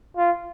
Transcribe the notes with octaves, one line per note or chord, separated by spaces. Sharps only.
F4